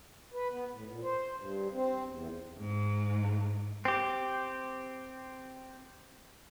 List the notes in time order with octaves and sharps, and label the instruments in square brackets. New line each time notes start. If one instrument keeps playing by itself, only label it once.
[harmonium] B4
B3
A2
A#2
C5
G2
C4
E2
[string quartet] G#2
[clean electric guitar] C4 G4